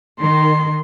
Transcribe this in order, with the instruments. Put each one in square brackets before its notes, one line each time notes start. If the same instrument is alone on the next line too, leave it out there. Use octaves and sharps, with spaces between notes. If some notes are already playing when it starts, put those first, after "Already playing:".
[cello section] D#3 [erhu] C6